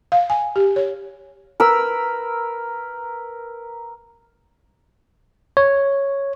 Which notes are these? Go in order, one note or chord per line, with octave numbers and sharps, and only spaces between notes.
F5
G#5
G4
C#5
A#4 B4 E6
C#5